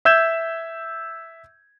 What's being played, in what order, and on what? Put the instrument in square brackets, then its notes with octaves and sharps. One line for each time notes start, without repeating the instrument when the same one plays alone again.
[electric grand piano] E5 E6 G6 G#6 E7